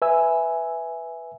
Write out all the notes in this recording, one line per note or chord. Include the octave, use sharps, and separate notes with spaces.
B4 E5 G#5 E6